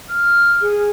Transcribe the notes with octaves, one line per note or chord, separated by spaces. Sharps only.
F6
G#4